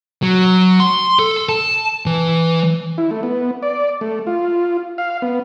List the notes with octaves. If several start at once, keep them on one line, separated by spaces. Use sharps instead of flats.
F#3
C6
A4
A5
E3
E4
A3
B3
D5
A3
F4
F5
B3